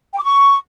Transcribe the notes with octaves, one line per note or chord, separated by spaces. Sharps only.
G5
D6
C#6